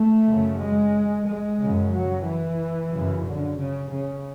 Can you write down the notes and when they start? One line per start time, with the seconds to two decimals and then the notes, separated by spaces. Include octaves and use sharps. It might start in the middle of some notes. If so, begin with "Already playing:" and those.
Already playing: A3
0.27 F#2 C#3
0.59 G#3
1.27 G#3
1.59 C#3
1.64 F#2
1.93 F#3
2.25 E3
2.92 F#2 C#3
3.25 D3
3.58 C#3
3.91 C#3